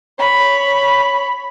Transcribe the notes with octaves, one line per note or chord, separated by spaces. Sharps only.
C#5 B5